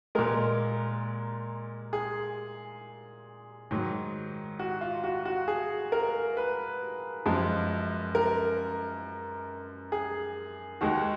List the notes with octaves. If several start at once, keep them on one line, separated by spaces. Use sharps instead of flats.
A#2 G#3 A#4
G#4
G#2 D#3 F#3
F#4
F4
F#4
F#4
G#4
A#4
B4
F#2 F3 G#3
A#4
G#4
D#2 D#3 G#3 F#4